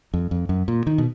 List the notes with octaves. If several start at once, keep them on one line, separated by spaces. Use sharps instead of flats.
F2
F2
F#2
A#2
D#3
B2